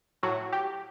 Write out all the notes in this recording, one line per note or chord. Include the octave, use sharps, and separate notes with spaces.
A2 F#3 F#4
G4